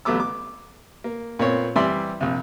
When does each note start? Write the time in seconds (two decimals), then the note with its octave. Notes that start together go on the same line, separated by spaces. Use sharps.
0.05 A1 F#3 A3 B3 D6 E6
0.20 D6
1.04 A#3
1.39 A#2 B3 C4 C#5
1.76 E3 G3 C4 D5 E5 C6
2.21 A#1 C3